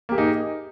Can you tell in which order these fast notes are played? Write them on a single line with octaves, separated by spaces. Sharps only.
A#3 G4 G#4 D#4